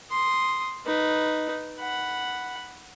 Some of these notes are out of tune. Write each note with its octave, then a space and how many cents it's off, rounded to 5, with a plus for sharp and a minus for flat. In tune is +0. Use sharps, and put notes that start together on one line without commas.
C6 +0 D#6 +0
D#4 +0 B4 +0
F#5 +0 B5 +0